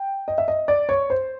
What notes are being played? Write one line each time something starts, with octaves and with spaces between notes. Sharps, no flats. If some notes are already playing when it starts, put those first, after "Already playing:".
Already playing: G5
D#5
E5
D#5
D5
C#5
C5